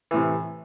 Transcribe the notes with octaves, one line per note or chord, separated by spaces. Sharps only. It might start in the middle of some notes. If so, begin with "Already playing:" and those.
A2 C3 E3